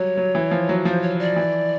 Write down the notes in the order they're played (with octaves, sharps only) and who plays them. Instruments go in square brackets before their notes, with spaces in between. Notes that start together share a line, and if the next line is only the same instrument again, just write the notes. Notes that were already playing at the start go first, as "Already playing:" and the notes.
Already playing: [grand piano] F#3 G3 [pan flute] C#5
[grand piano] F#3
E3
F3
F#3
[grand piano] F3 [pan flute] C5
[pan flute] C#5
D5
[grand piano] E3